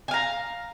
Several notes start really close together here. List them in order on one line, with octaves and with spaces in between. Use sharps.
G#5 F5 A#5